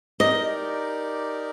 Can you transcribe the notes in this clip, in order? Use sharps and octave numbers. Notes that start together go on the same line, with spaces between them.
D#4 G4 A#4 D5 D#5